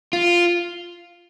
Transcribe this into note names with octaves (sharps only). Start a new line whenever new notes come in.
F4